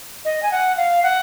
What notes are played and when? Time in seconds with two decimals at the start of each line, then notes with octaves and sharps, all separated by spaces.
0.25 D#5
0.43 G#5
0.51 F#5
0.77 F5
1.03 F#5